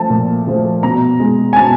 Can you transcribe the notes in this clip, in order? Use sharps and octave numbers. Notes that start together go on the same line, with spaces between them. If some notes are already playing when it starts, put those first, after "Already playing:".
Already playing: F3 A3 A5
A#2
F3 A3
B2 A#5
G#3
G#5
B2 A5